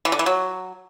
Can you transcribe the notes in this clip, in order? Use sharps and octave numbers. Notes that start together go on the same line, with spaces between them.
E3
D3
E3
F#3